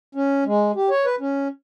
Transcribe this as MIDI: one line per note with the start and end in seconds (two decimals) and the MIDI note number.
0.15 0.44 61
0.46 0.72 56
0.75 0.89 67
0.90 1.06 73
1.06 1.16 71
1.20 1.48 61